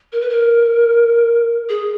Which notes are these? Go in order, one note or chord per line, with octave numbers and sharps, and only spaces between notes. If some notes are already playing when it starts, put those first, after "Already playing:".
A#4
B4
A#4
G#4